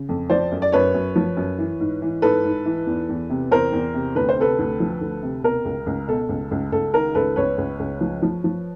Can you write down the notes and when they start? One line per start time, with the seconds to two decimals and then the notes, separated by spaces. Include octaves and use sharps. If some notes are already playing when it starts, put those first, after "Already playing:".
Already playing: C#3
0.09 F2
0.30 F3 C5 D5
0.51 F#2
0.62 D5
0.72 F#2 B4 C#5
0.94 F#2
1.16 F3
1.37 F#2
1.58 E3
1.80 G#2
2.02 E3
2.22 G#2 A4 B4
2.44 G#2
2.66 E3
2.87 E2
3.09 E2
3.30 C3
3.51 E2 A#4 C5
3.72 E2
3.94 C3
4.15 D2 B4
4.29 C5
4.37 C3 A4 B4
4.59 D2
4.80 F3
5.01 D2
5.23 C3
5.43 B2 A#4
5.65 C#2
5.86 C#2
6.07 B2 A4
6.29 C#2
6.51 C#2
6.72 C#2 A4
6.94 D#3 A#4
7.15 C#2 A4 B4
7.36 C#2 B4 C#5
7.58 C#2
7.79 C#2
8.01 F3
8.22 F3
8.44 F3